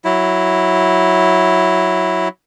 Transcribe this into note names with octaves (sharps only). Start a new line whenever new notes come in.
F#3 E4